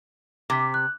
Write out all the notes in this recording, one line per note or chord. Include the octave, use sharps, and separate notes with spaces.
C3 D6 B6
F#6